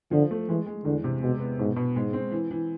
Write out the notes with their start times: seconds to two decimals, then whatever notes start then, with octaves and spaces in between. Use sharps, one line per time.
0.11 D3 F3
0.31 A3
0.48 E3 G#3
0.66 G#3
0.85 E2 D3
1.04 C3
1.22 B2 G#3
1.40 B3
1.59 G#2 B2
1.76 B2
1.96 G#2 G#3
2.13 C4
2.31 E3
2.51 E3